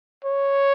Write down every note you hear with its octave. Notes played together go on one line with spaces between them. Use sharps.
C#5